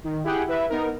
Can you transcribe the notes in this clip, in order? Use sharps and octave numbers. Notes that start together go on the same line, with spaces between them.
D#3
E4 G4 G#4 F#5 G5
E4 B4 E5
B3 D#4 A#4